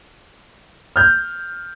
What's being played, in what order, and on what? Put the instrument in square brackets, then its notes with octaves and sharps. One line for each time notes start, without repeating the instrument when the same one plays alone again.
[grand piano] F6 G6